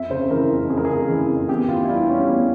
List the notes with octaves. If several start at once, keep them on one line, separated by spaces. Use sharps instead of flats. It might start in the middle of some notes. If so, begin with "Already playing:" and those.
Already playing: F2 E5
C#3 C5
E3 A#4
F2
F2 G#4
A#4
C#3 G#4
E3
F2
E2 G4
E3 F4
E4
G3 F4
C#4
E2